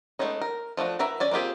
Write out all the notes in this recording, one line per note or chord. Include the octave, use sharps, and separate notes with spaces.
G#3 A3 B3 C#4 D#4
A#4
F3 A3 D4 F#4
E3 F#4 A#4 E5 A#5
C#4 D5 G#5
A#3 C4 F4 G4 G#4